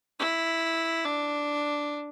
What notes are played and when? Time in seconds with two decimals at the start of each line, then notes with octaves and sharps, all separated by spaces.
0.19 E4
1.06 D4